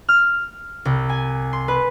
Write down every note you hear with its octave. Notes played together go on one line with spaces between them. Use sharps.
F6
C2
G#5
C6
B4